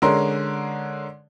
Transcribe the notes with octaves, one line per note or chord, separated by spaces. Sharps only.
D3 G#3 C#4 A#4 C6